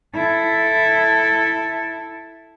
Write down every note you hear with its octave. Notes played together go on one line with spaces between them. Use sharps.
E4 A4